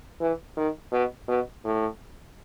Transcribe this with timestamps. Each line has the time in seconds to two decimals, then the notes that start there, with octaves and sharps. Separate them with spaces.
0.21 E3
0.57 D#3
0.92 B2
1.28 B2
1.64 A2